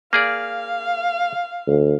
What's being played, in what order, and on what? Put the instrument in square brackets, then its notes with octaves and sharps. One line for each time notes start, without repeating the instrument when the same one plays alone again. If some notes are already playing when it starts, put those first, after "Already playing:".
[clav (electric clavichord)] A#3 G#4 D5 [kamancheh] F5
[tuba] D2